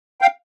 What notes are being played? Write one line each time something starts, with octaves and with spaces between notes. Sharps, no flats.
F5 G5